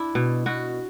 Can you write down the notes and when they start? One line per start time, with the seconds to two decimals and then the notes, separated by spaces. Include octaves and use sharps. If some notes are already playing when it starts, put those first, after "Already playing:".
Already playing: D4 E4
0.15 B2
0.46 B2 F#4